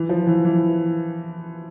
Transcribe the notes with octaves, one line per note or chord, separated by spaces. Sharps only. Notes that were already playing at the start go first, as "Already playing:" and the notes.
Already playing: E3
F3
E3
E3